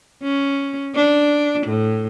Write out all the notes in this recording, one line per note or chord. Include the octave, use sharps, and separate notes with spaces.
C#4
D4
A2